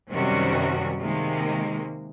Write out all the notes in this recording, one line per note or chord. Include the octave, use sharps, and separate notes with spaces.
F#2 C3 D#3 G3 C#4 F#4
C3 D#3 G#3 A#3